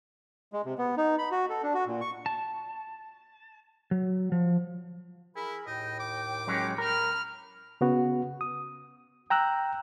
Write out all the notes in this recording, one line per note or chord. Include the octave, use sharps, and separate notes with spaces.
G#3
C3
B3
D#4
B5
F#4
A4
D4
F#4
A#2
C#6
A5
F#3
F3
E4 G#4 A#4 B5
D#2 A2 D#5 G5
D6
F#3 G#3 C#4
A#4 B5 F6
C#3 B3 F#4
D#6
G5 A#5 E6 F#6